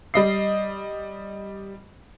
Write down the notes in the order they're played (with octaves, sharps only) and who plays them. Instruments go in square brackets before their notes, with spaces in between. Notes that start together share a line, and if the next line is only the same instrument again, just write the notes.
[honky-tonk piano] G3 D#5 C7